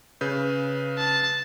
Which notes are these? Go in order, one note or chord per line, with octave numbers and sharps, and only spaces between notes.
C#3 B4 G6
A5